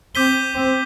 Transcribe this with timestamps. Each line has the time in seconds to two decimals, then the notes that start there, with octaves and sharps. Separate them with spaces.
0.15 C4 D6 G6 B6 D#7 G7
0.54 C4